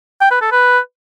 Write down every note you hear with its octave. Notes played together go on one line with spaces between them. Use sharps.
G5
B4
A4
B4